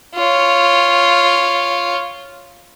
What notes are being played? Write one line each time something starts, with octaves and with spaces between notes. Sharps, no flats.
F4 C#5